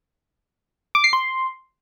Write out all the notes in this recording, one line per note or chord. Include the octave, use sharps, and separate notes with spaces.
D6
C7
C6